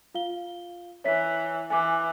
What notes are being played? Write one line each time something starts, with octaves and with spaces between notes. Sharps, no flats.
F4 F5 G7
E3 C#5 E5 B6
E3 G#5 D6